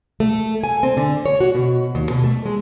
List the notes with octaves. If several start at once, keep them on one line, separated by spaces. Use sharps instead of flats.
A3
G#5
C4
D3
C#5
F#4
B2
D#2
B2
A3
G#3